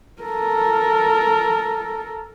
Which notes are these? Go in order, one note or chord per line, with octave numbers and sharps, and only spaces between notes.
A4 A#4